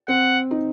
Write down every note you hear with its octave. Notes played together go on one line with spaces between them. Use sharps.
C4 F#5
D#4